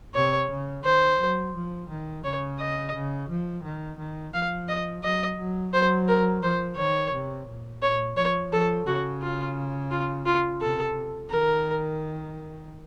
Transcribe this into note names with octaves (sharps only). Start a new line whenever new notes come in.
C3 C#5
C#3
D#3 C5
F#3
F3
D#3
C#3 C#5
D#5
C#3
F3
D#3
D#3
F3 F5
D#5
F#3 D#5
F#3
F#3 C5
A#4
F3 C5
D#3 C#5
C3
A#2
A#2 C#5
F3 C#5
F3 A4
C#3 F#4
F4
F4
F4
C3 A4
D#3 A#4